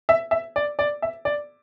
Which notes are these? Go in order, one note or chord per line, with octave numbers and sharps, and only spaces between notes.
E5
E5
D5
D5
E5
D5